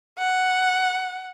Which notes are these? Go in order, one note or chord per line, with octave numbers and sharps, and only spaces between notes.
F#5